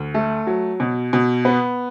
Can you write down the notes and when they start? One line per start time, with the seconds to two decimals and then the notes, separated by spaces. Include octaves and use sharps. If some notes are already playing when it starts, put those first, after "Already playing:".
Already playing: D2
0.15 A3
0.47 F#3
0.80 B2
1.13 B2
1.45 B3